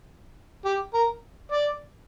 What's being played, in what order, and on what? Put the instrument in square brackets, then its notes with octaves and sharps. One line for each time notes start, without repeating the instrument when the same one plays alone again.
[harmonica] G4
A#4
D5